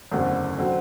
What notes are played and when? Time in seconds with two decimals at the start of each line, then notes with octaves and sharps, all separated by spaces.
0.11 F#1 E2 D3 A3 C4
0.58 D3 F#3 C4